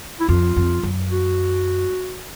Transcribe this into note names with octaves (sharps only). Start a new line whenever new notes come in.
E4
F2 F4
F2
F#2
F#4